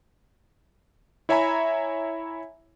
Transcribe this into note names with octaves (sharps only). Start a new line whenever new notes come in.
E4 C#5 E5 G#5 A#5 B5